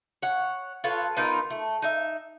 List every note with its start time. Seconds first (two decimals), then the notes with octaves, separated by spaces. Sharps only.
0.23 C#5 F#5
0.84 F4 A4 B4 C#5
1.17 B3 D#4 F4 A#4
1.50 A3
1.82 D#4 E5